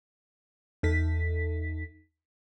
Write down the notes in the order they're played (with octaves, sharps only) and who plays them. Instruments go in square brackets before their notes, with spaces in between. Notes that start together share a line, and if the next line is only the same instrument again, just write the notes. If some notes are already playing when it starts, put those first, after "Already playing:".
[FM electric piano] E2 D#4 A4 B6